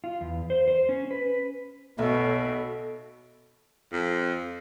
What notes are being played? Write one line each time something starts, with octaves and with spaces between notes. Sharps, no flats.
F4
E2
C5
C5
C#4
B4
B1 B2 A4 E5
F2